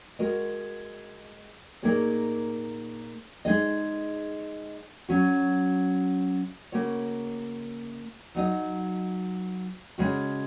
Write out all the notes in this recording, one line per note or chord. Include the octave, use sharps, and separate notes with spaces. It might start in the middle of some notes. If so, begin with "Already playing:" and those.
G#3 F#4 A#4 D#5
A#2 A#3 D#4 G#4 C#5
G#3 D#4 G#4 D#5
F#3 C#4 F#4
C#3 A#3 F#4 C#5
F#3 D#4 F#4 D#5
C#3 G#3 F#4